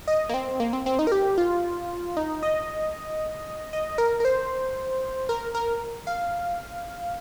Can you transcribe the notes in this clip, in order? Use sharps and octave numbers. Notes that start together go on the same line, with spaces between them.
D#5
A#3
C4
A#3
C4
C4
D#4
A#4
G4
F4
D#4
D#5
D#5
A#4
A#4
C5
A#4
A#4
F5